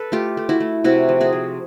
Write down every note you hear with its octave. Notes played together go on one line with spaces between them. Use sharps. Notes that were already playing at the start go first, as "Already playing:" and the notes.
Already playing: A4 B4
A3 F4 G4
A3
E4 F#4
A3
C3 E4 F#4
F3
F#4 G#4
F3